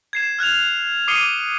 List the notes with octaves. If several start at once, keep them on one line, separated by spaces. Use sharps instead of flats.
G#6 C7 E7
F6 F#6 G#6 F7
D6 D#6 C7 C#7 D#7 G7